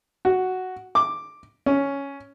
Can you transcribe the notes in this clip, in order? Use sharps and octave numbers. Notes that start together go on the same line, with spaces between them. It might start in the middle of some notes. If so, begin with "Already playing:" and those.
F#4
D6
C#4